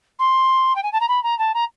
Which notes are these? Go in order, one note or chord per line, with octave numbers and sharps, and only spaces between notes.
C6
G5
G#5
A5
A#5
B5
A#5
A5
A#5